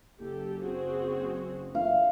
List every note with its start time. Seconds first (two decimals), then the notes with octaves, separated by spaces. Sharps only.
0.20 F#1 G4 A4
0.61 C4 F#4 G#4
1.75 F5